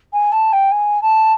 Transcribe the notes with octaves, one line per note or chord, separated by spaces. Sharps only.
G#5
A5
G5
G#5
A5